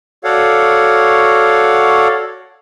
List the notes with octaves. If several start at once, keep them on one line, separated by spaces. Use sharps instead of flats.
F#4 A4 C#5 D5 F5 F#5